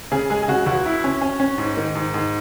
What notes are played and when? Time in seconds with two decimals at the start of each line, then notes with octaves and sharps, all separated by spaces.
0.12 C#3 G#4
0.30 G#3 G#4
0.43 G#4
0.48 C#3 F#4
0.66 C#2 F#4
0.86 E4
1.04 C#4
1.22 C#4
1.40 C#4
1.58 G#2
1.77 D#3
1.95 G#2
2.14 G#2